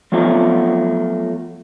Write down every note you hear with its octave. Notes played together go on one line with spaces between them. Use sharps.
F3 F#3 A3 B3 F4